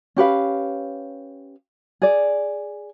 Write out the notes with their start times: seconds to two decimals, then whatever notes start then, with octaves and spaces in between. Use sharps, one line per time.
0.16 C#4 G4 B4 F5
2.02 G#4 D5